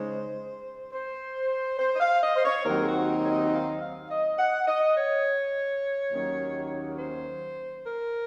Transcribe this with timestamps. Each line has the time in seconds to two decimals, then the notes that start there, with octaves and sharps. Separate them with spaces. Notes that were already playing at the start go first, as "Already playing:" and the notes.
Already playing: C#3 G#3 D#4 C5
0.92 C5
1.79 C5
1.96 D#5
2.00 F5
2.22 D#5
2.35 C5
2.44 C#5
2.65 D#2 D#3 F#3 C4 D#4 A#4
2.83 G#4
2.87 F#4
3.09 A#4
3.24 C#5
3.30 D#5
3.52 F5
3.81 F5
4.10 D#5
4.39 F#5
4.67 D#5
4.96 C#5
6.11 D#2 D#3 F#3 A#3 C#4
6.98 C5
7.84 A#4